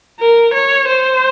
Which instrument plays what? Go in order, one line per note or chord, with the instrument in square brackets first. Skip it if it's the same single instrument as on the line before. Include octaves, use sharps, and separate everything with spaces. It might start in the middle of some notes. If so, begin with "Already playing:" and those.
[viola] A#4
C#5
C5